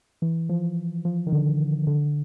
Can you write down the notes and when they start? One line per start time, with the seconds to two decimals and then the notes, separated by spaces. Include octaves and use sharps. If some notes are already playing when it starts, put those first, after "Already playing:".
0.22 E3
0.49 F3
1.05 F3
1.27 D#3
1.32 D3
1.87 D3